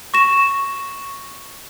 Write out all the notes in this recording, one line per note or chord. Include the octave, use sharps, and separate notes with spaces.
C#6 A#6 E7